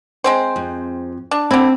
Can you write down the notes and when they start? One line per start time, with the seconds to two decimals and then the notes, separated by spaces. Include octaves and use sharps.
0.24 G#3 C4 C5
0.56 F2
1.31 D4
1.51 D3 C4 E4